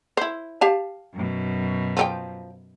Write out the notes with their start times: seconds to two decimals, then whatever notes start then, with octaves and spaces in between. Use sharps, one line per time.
0.17 E4 C5
0.61 G4 F5 A5
1.14 F#2 B2
1.97 F3 C4 G5